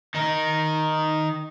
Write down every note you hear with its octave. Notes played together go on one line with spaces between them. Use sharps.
D#3 D#4